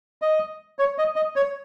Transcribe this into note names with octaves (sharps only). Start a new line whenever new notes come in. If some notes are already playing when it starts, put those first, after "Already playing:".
D#5
C#5
D#5
D#5
C#5